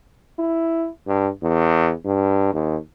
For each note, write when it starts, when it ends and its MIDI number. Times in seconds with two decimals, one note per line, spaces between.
0.39 0.89 64
1.07 1.29 43
1.43 1.92 40
2.05 2.53 43
2.53 2.77 39